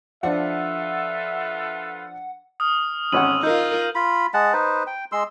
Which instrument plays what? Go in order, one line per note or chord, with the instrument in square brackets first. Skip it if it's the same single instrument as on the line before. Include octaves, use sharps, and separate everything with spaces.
[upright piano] F3 D4 [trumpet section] F4 A4 B4 [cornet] E5 [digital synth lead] F#5
[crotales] D#6 F6
[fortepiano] G#1 C#4 F#5 [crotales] E6 D#7 F#7
[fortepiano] D#4 [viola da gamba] F4 A#4 [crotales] D#6 G6
[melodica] F4 B5
G#3 F#5 A5
D#4 B4 C5
G5
G#3 C6 E6